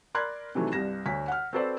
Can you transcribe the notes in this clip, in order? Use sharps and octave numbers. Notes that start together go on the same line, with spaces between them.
A#4 D5 B5 C6 F#6 G#6
C3 D#3 E3 F#3 A3
C2 G2 A#6 E7
D2 C#5 B6
F#5 F6
C4 F#4 A4 B4 C5 D5